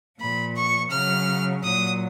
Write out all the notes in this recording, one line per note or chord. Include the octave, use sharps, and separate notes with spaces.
A#2 F3 B5
C#6
C#3 F#3 F6
A#2 F#3 D#6